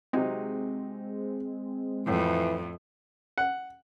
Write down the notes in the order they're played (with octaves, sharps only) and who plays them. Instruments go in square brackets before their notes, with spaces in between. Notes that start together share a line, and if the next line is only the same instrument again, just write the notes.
[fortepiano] C3 F#3 D#4 [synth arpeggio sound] G#3 C4
[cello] F2 [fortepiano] A2 [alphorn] E3
[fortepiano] F#5